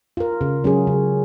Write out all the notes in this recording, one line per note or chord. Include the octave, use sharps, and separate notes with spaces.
F4 A#4
C#3
F#3 C#4 G#4
C#3